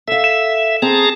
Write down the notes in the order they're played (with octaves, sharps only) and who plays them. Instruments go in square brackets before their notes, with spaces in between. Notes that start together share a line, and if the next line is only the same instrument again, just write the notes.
[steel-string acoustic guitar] A4 F5 [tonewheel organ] E5
[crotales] E7
[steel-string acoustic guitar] C4 [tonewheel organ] G#4 A5 A#5